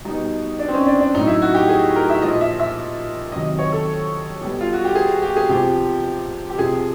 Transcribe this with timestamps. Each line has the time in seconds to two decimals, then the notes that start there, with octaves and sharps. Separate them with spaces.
0.05 B2 G3 D#4
0.59 D4
0.68 C4
0.74 C#4
0.87 D4
1.00 D4
1.14 A2 F#3 D#4
1.27 E4
1.42 F#4
1.54 G4
1.69 G#4
1.96 A#4
2.10 E5
2.22 A#2 F3 D#5
2.41 E5
2.60 E5
3.32 C3 D#3 F#3 D#5
3.46 D#5
3.59 C#5
3.72 A4
4.41 B2 G3
4.61 F4
4.73 F#4
4.84 G4
4.95 G#4
5.22 G4
5.36 G#4
5.49 C3 F3 G4
6.50 G4
6.58 C3 F3 G#4